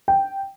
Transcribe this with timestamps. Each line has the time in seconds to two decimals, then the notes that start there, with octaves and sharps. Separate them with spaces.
0.08 G5